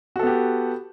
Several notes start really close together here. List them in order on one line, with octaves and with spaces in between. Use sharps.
F#4 A4 B3 G4